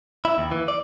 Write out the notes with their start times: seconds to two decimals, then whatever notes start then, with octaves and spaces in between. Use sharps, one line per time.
0.25 E4
0.38 D#2
0.52 E3
0.68 D5